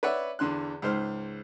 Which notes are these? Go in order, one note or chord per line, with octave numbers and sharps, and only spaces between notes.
B4 C#5 D5 E5 F#5
E2 D3 C6 F#6
C#2 G#2 C5 F6